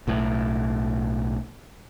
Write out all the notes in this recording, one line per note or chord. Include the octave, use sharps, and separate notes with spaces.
B1 A2